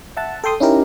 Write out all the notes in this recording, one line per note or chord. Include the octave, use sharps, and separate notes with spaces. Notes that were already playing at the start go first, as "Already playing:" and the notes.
E5 F#5 A5
A4 G5 C6 D#6
C#4 D#4 E4 G4 A#4